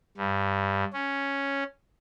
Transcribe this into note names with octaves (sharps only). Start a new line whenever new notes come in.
G2
C#4